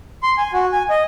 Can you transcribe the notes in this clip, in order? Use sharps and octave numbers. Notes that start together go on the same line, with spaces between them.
C6
G#5
F#4
G#5
D#5